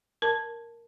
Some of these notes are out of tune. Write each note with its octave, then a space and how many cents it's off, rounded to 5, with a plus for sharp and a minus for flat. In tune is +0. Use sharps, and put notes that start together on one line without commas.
A#4 +0 A5 +0